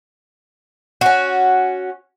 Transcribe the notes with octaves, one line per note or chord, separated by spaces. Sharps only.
C#4 F#4